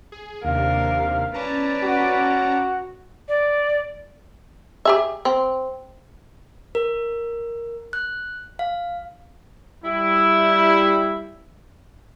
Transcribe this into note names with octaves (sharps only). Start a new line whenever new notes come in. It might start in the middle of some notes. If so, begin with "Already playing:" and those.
G#4
D#2 C3 D4 A#4 F5
C#4 B4 D5 A5 A#5
F#4
D5
G4 G#4 E5
C4
A#4
F#6
F5
G3 E4